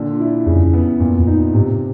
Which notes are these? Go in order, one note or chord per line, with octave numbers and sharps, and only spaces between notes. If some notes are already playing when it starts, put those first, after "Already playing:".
Already playing: A#2 D3
E4
F2 C#3
B3
F#2 A#2
F2
D#4
G#2 C3